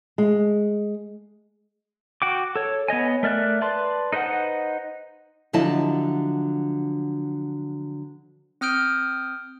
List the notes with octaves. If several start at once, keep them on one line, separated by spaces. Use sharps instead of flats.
G#3
F#4 G5 D6
A4 C#5
B3 C#5 D#5 G#5
A3 A#4 D5 E5 F#6
B4 D5 A5 C6
D#4 B4 C5 D#5 F#5
D3 F3 F#3 E4 D#5 A5
C4 D#6 F6 G6 D7